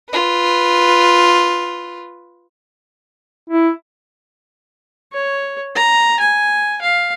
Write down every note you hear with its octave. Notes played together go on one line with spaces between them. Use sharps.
F4 B4
E4
C#5
A#5
G#5
F5